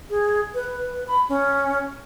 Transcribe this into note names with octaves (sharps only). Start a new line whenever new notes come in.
G#4
B4
B5
C#4